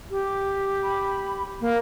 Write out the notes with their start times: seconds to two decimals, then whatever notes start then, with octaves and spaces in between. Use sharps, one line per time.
0.11 G4
0.84 B5
1.61 A#3